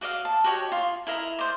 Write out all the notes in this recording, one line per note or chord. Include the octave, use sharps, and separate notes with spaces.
F#4 D5 D#5 F5
A5
F#4 G4 C#5 D#5
F4
E4 A#4 D#5
C5 D5